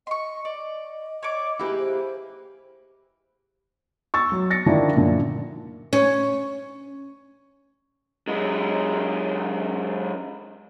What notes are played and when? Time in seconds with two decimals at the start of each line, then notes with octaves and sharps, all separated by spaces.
0.07 D#5 C6 C#6
0.45 D5 D#5
1.23 C#5 D5 D6
1.60 A#3 E4 G4 G#4 B4
1.79 C5
4.14 C#6 E6 A6
4.32 F#3
4.50 A6 A#6 C#7
4.66 D3 D#3 F3 D4 E4
4.94 F#2 A#2 D3
5.93 C#4
8.27 F#2 G#3